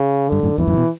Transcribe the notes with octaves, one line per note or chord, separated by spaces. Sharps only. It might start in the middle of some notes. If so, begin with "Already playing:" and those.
Already playing: C#3
G2 D3
F#2 A2
E2 G2 E3
F#2 A2
C#3
B2